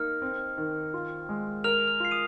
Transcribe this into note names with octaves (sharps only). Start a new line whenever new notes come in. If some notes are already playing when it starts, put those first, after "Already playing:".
Already playing: A#3 D#4 F6
C4
D#3
F4
G#3
A#4 F6 F7
F6 F7
F4 C7
D#6 D#7